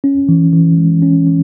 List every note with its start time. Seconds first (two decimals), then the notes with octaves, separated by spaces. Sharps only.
0.04 C#4
0.29 E3
0.53 E3
0.77 G#3
1.02 C#4
1.27 E3